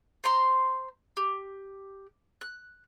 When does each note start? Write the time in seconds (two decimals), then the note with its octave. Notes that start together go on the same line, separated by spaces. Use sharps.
0.24 C5 A#5 C6
1.17 G4
2.41 F#6